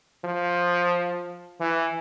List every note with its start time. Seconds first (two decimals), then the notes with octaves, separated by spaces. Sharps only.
0.24 F3
1.60 E3